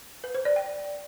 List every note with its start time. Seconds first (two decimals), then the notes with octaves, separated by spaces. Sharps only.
0.24 B4
0.35 C5
0.45 D5
0.56 G5